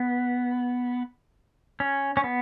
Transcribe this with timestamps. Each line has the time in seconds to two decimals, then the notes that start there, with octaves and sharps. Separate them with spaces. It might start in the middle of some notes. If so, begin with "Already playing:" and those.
Already playing: B3
1.80 C#4
2.17 C#4
2.24 B3